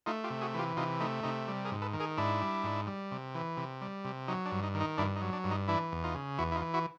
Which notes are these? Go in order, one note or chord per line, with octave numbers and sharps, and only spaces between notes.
A3 D#4 F4
F4 G4
C3
F#4 G#4
E3 F4 G4
C3 D#4 F4
A3 D#4
C3 D#4
G3
G#4 A#4
G#2
A4 B4
D#3
G#4 A#4
G#2 D4 E4
G3
G#2
G3
C3
E3
C3
G3
C3
F#3 D#4
D4
G2
D#4
D#3
D#4
G2 D4 E4
D#4
F#3
D4
G2
D#4
E3 D4 E4
E2
D#4 F4
C#3
E2 E4 F#4
E4
D#4 F4
E3
E4 F#4